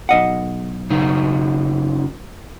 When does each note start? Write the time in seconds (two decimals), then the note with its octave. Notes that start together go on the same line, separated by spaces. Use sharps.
0.09 B1 D#5 F#5
0.90 F#2 C#3 D#4